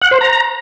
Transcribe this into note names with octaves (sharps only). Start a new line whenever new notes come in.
F#5
C5
A#5